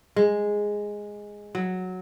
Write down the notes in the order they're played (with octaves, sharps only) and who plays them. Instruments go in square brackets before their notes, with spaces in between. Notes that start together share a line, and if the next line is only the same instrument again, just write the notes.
[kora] G#3
F#3